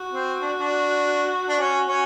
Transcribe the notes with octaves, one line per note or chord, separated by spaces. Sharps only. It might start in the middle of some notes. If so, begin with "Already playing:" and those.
Already playing: F#4
C4
D4
D4
D4
C#4
C#4